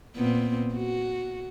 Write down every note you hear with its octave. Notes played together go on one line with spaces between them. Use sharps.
A#2 B3 C4
F#4